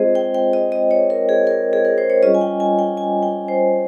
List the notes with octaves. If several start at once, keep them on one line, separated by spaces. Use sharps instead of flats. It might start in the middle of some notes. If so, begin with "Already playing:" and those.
Already playing: G#3 C4 F4 G#4 C5 D#5
G5
G5
D#5
D#5
C#5
A#4
G#4
A#4
G#4
A#4
C5
C#5
G3 C#4 F4 D#5
G#5
G5
G#5
G5
G#5
G5
C5